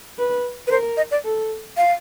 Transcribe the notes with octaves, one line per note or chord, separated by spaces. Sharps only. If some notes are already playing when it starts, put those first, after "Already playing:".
B4
B4
A#4 C5
D#5
D5
A4
F5